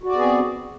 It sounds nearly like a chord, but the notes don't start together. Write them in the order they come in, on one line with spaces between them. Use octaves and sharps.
F#4 D5 B3 G#4 C4